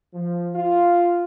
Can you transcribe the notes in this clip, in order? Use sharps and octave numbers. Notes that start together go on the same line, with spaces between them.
F3
F4